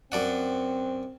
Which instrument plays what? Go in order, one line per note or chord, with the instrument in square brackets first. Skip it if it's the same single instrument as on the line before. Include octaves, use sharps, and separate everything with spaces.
[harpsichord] F#2 D5 F#5 [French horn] C4